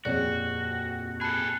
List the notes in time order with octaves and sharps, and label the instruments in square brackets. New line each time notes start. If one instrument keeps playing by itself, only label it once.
[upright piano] D#1 F2 [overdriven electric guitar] F#4 [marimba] G#4 C#5 D5 [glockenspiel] F#6
[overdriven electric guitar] G#4 A4 [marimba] A5 G#6 [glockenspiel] B5 F#6